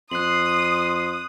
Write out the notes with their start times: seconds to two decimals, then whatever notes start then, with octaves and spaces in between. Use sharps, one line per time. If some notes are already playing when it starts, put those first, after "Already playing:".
0.11 F2 C6 D#6 F#6 C7 F#7